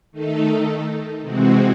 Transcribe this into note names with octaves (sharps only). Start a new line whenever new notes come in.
D#3 A3 D#4 A4
C3 E3 G#3 C4 F#4